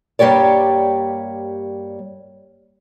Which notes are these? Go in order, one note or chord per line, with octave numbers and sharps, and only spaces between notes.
G2 G3 A#3 G4 C#5 D5